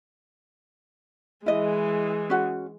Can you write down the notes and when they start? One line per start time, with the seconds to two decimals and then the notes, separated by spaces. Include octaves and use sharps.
1.46 E3 G#3 E4 D#5
2.30 C#4 F#4 F#5